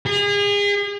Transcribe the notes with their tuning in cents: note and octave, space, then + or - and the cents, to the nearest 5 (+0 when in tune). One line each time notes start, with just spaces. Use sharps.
G#4 -35